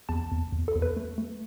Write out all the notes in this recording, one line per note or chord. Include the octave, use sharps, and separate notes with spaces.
E2 A5
E2
E2
A4
E2
B4
A3
A3